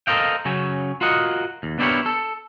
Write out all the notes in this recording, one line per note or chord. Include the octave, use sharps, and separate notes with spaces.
A4 A#4 C5 D#5 F5 G5
C#3 F#3 C#4
F4 F#4 A#4 D#5 F#5
D#2
B3 D4 E4 G4 A#4 C#5
A4